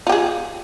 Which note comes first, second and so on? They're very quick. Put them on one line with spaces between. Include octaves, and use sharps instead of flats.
F4 G4 G#4